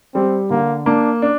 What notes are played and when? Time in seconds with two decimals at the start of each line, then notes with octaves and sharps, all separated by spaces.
0.15 G3 C4
0.50 D3 A#3
0.86 A#3 D4
1.22 D4